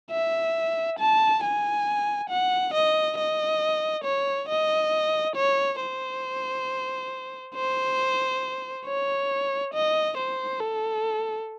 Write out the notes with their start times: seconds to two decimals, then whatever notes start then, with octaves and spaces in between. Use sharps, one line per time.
0.11 E5
0.99 A5
1.43 G#5
2.30 F#5
2.74 D#5
3.18 D#5
4.05 C#5
4.49 D#5
5.36 C#5
5.80 C5
7.55 C5
8.86 C#5
9.74 D#5
10.18 C5
10.60 A4